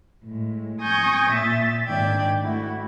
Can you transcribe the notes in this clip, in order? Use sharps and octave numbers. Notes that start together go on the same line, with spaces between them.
A2 G#3
G#5 C#6 D#6 G6 G#6 A#6
A#2 E5 A6
G#2 D#3 D4 D5 G5 G#6
A3 E4 F#4